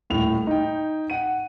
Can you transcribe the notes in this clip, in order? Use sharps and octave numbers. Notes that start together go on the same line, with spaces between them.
D#1 A2 F7
D#4 G5
F#5 D#7